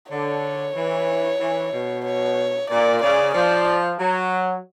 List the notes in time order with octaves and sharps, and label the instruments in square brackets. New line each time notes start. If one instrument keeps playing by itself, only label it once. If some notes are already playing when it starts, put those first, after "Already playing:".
[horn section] D3 [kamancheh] C#5
[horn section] E3
E3
B2
[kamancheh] C#5
[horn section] A#2 [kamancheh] D5
[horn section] C#3 [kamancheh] D5
[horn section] F3 [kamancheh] D5
[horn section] F#3